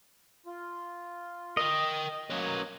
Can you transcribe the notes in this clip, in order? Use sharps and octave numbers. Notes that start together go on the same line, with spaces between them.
F4
A#4 D#5 G5
F#3 A#3 C#4 B4 C#5